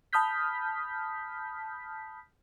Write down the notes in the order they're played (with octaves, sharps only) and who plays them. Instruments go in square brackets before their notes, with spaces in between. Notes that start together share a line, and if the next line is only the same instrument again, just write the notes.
[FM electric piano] A5 B5 D#6 F6 G6 B6